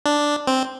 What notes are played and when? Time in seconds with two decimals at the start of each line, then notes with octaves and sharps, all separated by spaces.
0.06 D4
0.47 C4